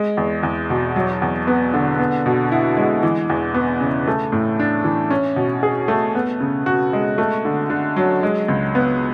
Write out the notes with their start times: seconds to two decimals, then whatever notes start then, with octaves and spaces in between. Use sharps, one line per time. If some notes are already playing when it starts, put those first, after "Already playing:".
Already playing: G#3
0.17 E2
0.43 E2
0.70 B2
0.96 F#3
1.22 E2
1.47 B3
1.74 D3
1.99 B3
2.26 B2
2.52 E4
2.77 G#3
3.03 E3
3.30 E2
3.54 B3
3.80 C#3
4.07 A3
4.32 A2
4.59 D4
4.84 E3
5.10 C#4
5.36 B2
5.63 G#4
5.88 A3
6.15 B3
6.40 C#3
6.66 F#4
6.93 G#3
7.18 A3
7.45 D3
7.70 D3
7.96 F#3
8.23 G#3
8.48 C#2
8.75 B3